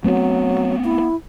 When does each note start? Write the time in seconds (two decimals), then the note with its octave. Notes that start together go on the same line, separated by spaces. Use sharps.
0.04 F#3 A3 B3 C4
0.84 E4